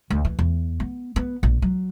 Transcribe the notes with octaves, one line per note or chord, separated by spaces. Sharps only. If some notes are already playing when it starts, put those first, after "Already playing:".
D2
E3
E2
B3
B3
A#1
F#3